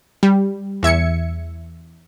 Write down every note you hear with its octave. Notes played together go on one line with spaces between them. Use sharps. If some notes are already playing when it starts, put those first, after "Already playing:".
G3
E2 E5 G#6 C#7